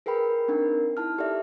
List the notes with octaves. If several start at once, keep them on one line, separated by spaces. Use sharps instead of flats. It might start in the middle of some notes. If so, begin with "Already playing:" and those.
G#4 A#4 B4 G5 B5
C4 D4 D#4 A#4
D#4 E4 A5 F6
G4 A4 D5 E5